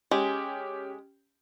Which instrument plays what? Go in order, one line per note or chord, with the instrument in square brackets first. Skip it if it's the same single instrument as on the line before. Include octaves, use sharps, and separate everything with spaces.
[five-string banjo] G#3 [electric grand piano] C#4 G4